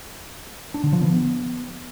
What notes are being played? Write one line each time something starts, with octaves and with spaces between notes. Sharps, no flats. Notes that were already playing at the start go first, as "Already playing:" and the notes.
D4
D3
F3
B3